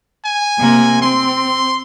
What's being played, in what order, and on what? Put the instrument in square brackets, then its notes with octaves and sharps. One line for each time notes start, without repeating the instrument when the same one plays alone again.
[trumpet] G#5
[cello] C3 A#3
[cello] C4 [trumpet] C6